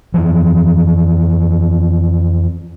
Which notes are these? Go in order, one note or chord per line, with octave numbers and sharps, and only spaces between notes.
F2 E3 F3